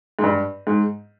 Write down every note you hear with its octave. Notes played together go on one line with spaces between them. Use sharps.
G#2
G2
G#2